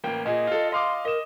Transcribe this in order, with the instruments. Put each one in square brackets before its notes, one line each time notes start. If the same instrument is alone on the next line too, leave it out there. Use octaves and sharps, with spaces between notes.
[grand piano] A1 A#3 G5
[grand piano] A#2 G#4 [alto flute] D#5
[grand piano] F4 A4
[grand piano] D#5 F5 D6 [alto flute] C6
[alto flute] A#4 [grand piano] D#5 E7